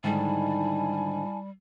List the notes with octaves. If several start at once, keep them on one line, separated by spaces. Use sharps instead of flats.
G#2 D3 D#3 G3 E4 G#5 A5